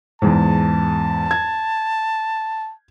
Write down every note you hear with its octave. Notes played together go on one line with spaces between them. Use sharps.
E2 G#2 A5
G#6